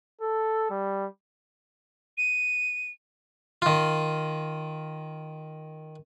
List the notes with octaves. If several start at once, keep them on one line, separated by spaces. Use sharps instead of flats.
A4
G3
D#7
D#3 F4